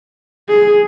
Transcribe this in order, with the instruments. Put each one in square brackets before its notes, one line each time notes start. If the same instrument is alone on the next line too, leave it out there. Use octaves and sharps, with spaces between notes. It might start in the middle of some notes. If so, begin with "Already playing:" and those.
[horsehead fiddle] G#4